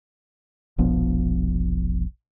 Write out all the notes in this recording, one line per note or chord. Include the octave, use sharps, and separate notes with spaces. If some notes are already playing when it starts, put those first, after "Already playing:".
E1 A#1 F3 B3